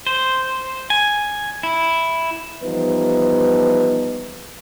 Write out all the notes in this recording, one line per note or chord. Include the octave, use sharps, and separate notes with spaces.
C5
G#5
E4
E3 F3 G3 B3 D#4 B4